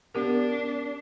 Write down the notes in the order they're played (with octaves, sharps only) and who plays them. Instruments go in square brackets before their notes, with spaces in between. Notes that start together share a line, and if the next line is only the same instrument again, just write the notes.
[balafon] B3 G4 A#4 [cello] D4